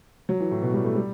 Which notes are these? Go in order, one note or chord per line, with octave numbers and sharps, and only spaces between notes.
F#3
E3
A2
B2
G3
A3
G3